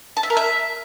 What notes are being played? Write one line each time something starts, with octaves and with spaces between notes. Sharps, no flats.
A5
E5
A#4
E5